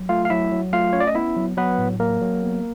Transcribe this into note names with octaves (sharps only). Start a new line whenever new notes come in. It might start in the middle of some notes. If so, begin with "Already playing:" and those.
Already playing: F#3
A3 F4 F5
F5
F#3 E4 E5
F#3
A3 F4 F5
C#4 C#5
D5
D#5
B3 E4 E5
F#3
F#3 B3 B4
A2
F#3 A#3 A#4
F#3
B3